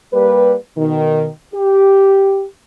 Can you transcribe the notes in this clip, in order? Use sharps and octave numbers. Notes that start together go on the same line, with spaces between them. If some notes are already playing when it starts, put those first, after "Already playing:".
G3 A#3 B4
B2 D#3
G4